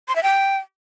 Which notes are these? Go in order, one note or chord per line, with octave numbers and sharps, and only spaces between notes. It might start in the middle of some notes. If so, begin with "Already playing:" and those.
C6
E5
G5